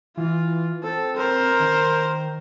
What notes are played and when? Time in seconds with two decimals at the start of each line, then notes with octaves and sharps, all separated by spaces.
0.17 E3 F4
0.83 C4 A4
1.16 A#4 C5
1.60 D#3